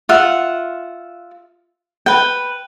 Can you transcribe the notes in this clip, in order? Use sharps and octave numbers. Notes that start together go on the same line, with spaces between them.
F4 E5 F#5
B4 G5